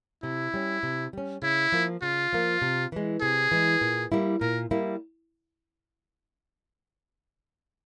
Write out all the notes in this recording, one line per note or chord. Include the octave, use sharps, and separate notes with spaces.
C3 E4
G3 C#4
C3
G3 C#4
C#3 E4
F3 A#3
C#3 F4
F3 A#3
C3
E3 G#3
C3 G#4
E3 G#3
A#2
G3 A#3 E4
A#2 A#4
G3 A#3 E4